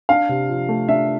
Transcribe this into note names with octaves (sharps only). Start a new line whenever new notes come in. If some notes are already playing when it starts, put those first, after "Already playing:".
D4 F5
C3
F3
A3
D4 E5